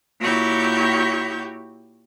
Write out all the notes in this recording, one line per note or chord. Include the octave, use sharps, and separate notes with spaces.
A#2 E4 F#4 G4 C#5 G6